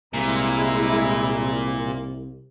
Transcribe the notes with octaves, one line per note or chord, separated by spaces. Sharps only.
C2 A#2 G#3 E4